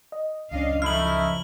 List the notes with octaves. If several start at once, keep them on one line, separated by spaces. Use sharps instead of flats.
D#5
C#2 F#2 C#4 D4 D#5 F5
C#3 F3 A3 D#4 E4 F6 F#7